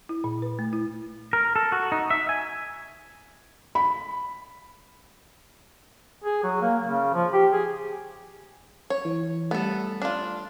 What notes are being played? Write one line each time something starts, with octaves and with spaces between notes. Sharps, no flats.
E4
A#2
B4
A3
E4
A#4
A4
F#4
D#4
E5
G#5
B5
G#4
F#3
A#3
C#3
F3
G4
G#4
C#5
E3
G3 A3 B3 A4
D4 F4